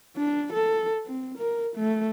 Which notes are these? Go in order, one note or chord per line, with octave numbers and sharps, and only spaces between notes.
D4
A4
C4
A#4
A3